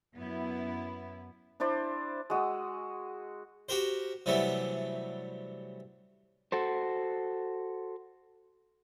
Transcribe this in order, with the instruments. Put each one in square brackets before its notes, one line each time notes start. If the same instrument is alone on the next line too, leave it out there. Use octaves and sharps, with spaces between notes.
[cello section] F#2 B3 E4
[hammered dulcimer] D4 E4 C5 D5
[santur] G#3 F#4 D#6 E6
[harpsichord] F#4 G4 A#4 C5
C3 E3 F#3 G3 A3 B3
[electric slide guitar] F#4 A4 C5